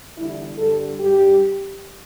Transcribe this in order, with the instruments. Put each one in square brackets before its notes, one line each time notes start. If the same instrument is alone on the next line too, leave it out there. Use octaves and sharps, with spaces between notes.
[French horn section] E2 D3 G3 E4
G2 D3 G3 A4
G2 G3 G4